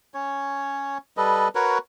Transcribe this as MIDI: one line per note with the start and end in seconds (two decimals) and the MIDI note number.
0.14 0.98 61
0.14 0.98 73
1.17 1.48 55
1.17 1.48 69
1.17 1.48 71
1.17 1.48 75
1.55 1.78 66
1.55 1.78 70
1.55 1.78 71
1.55 1.78 73